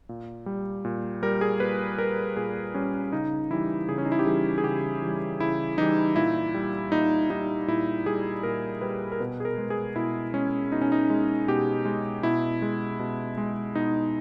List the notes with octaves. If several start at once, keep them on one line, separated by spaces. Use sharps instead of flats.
A#2
G3
A#2
G3 A#4
G#4
A#2 B4
G3 A#4
A#2 G#4
G3 C#4
C#3 D#4
E3 G3 E4
C#3 G#4
C#4
D#4
E4
G4
E3 G3 G#4
G#4
C#3 G4
E3 G3
C#3 E4
E3 G3 D#4
A#2 E4
G3
A#2 D#4
G3 D#4
A#2 E4
G3 G#4
A#2 A#4
G3 B4
A#4
B2 B4
G#4
A#4
G#3
G#4
B2 E4
G#3 C#4
B2 D#4
C#4
D#4
G#3
B2 G4
G#3
B2 E4
G#3
B2
G#3
B2 D#4